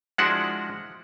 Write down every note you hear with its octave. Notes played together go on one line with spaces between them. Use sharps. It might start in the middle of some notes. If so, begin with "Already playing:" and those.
F3 G#3 D4 E4 F#4 F#5